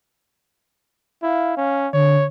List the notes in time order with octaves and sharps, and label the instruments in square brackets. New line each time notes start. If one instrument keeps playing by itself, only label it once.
[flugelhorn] E4 [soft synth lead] F5
[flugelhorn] C#4 [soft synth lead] F5
[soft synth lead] D3 [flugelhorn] C#5